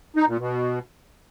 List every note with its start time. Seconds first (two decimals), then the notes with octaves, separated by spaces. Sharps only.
0.16 D#4
0.27 A#2
0.39 B2